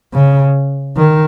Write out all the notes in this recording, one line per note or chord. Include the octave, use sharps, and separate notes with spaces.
C#3
D#3